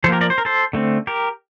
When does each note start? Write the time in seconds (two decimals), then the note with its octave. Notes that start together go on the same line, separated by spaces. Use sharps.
0.04 F3 A4 C5
0.08 A#3 G4 A#4
0.21 A#4 D5
0.30 C5
0.38 A#4
0.45 A4 C5
0.73 D3 A3 C4
1.07 G4 A#4